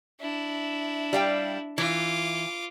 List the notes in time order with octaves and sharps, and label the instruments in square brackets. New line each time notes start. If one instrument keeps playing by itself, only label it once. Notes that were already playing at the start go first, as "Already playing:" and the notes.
[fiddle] D4 E4
[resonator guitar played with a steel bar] G3 F5 G5
[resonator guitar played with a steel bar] E3 [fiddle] F4 D6